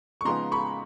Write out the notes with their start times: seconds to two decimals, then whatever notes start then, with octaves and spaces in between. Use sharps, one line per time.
0.21 C#6
0.25 C#3 F3 G#3 B3 D#4 A#5 C6
0.52 B5 C#6